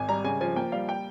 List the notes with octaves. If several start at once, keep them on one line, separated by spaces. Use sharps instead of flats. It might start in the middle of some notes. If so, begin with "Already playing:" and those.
Already playing: G#1 G#5
G3 A#5
C#3 G#5
F3 G#5
A#3 G5
G3 F5
G5